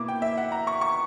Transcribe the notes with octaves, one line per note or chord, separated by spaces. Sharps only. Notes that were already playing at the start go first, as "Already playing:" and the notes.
Already playing: B2 A#3 E4 D6
G5
E5
F#5
A#5
C#6
C#6